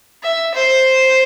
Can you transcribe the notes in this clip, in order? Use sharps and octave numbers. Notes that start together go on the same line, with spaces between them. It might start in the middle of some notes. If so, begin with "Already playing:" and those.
E5
C5